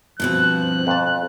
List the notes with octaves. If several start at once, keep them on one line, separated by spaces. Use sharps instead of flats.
G2 B2 F3 C4 F#6
F2 A5